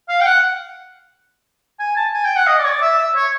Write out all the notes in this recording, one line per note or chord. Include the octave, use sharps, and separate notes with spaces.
F5
G5
F#5
G#5
A5
G#5
G5
F#5
D#5
D5
C#5
D5
E5
E5
C#5